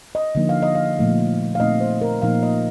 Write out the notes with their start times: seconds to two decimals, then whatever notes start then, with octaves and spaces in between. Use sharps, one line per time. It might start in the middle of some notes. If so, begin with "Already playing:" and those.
0.15 D#5
0.35 D3 F3 A#3 D#4
0.49 F5
0.63 D#5
0.75 F5
0.98 A#2 F3 A3 D#4
1.55 F5
1.60 A#2 A3 C4 D#4 D#5
1.81 C5
2.01 A#4
2.22 A#2 F3 A#3 D#4 F5
2.43 D#5